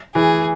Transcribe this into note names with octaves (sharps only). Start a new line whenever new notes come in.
E3 G#4